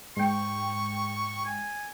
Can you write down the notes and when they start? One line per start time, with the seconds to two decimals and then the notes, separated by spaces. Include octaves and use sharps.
0.17 G#2 G5 C#6
1.45 G#5